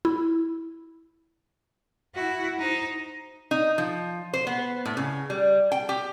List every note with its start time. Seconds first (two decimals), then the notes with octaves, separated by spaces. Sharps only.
0.05 E4
2.15 E4 F#4
2.58 D#4 C5
3.51 D#4
3.78 F3
4.33 C5
4.47 B3
4.85 A2
4.97 C#3
5.30 G3
5.72 G5
5.89 G4